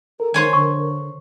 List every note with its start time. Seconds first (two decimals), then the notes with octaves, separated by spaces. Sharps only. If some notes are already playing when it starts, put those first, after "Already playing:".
0.20 A4 A#4
0.34 D#3 C5 C#5 G#5
0.53 D3 C#6